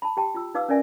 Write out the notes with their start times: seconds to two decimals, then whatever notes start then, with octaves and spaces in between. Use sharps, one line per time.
0.02 A5 B5
0.17 G4 G5 A5
0.35 F4 E6
0.55 D#4 B4 F5 D6 E6
0.69 C#4 A#4 D5 E5 G#5